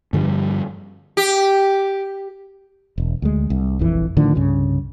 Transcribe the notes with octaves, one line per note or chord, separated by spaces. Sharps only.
G2 D3 F3 G3
G4
E1
D2 G#3
C2
F1 A#1 F2 E3
A2 D3 D#3 F3
C2 G2 C#3